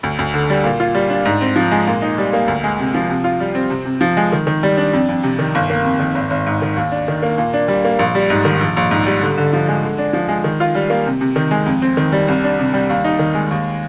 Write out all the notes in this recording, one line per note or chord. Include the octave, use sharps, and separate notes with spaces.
D2
D2
D3
G3
A#2
F4
G3
D4
G#2
C4
F3
G#3
A#2
D#4
G3
A#3
D2
G#3
C3
F3
C3
F4
G3
C4
C3
C3
F3
G#3
D#3
D#3
G3
D4
F2
F2
C3
D#3
G1
A#3
F2
D#3
G#1
G#1
G#2
D#3
D#2
D4
D#3
A#3
A#2
D4
G3
A#3
A#1
G3
G#2
D#3
A#1
A#1
G#2
G3
D3
D3
F3
G#3
D3
D4
F3
G#3
D#3
F4
G3
A#3
C3
C3
D#3
G#3
F2
C4
D#3
G3
C2
D4
C3
G3
D#2
D#4
D#3
G#3
D#2